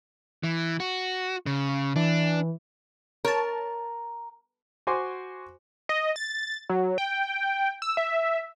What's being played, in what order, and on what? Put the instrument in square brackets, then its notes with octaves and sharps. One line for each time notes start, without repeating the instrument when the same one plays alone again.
[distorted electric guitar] E3
F#4
C#3
[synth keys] E3 [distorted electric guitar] D4
[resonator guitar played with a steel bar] A#4 [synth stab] C#5 A5
[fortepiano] F#4 C5 G#5 C6 D6
[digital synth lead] D#5
A6
F#3
G5
E6
E5